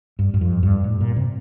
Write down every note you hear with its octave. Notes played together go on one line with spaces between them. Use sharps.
G2
G2
F2
G2
A2
A#2
C3